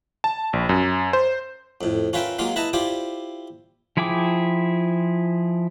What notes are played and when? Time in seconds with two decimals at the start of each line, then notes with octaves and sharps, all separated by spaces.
0.24 A5
0.53 A#1
0.69 F#2
1.13 C5
1.81 F2 A2
2.13 C#4 F4 A#4 B4 E5 G5
2.39 F#3 G#3 A#3 F4
2.56 E4 B4 D#5 E5 A5 A#5
2.73 E4 F4 G4 C5 D5
3.97 F3 E4 G#4 G5 D6